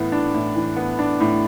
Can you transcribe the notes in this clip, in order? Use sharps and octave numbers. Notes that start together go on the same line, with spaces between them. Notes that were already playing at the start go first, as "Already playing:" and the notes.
Already playing: A2 E3 B3
D4
A2
E3
B3
D4
A2